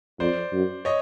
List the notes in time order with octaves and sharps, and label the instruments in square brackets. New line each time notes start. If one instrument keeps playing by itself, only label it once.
[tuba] F2 [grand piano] C5 D5
[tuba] F#2
[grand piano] C#5 D#5